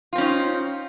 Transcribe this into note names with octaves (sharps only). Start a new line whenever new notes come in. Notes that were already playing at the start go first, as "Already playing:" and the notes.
C4 C#4 D#4 F4